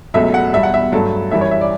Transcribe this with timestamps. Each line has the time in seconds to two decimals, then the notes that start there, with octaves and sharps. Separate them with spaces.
0.14 C#2 B2 F#3 A3 E5
0.34 F#5
0.53 E2 B2 G3 E5
0.63 F#5
0.74 E5
0.92 G2 F#3 A3 A4
1.31 F#2 E3 G3 E5
1.41 C#5
1.51 E5
1.61 D5